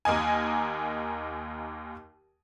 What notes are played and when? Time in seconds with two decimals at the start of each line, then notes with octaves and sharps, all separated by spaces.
0.05 D#2 A#3 D#5 G#5